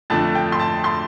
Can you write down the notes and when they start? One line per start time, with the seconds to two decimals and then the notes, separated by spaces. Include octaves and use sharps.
0.10 F2 D3 A3 D4 A5
0.35 G5
0.52 C6
0.60 A5
0.84 C6